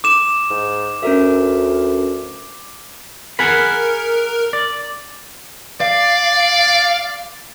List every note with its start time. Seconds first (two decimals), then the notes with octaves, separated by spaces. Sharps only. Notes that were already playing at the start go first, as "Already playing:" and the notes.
0.04 D6 E7
0.51 G#2
1.03 D2 C#4 A#4 E5
3.39 G#4 A#4 F#5 B5
4.53 D5
5.81 D5 F5